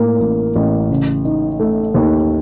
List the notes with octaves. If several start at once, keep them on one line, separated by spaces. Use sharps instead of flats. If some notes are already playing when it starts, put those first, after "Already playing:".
Already playing: A2 A#3
A1
A1
C#3
D#4
A3
D#2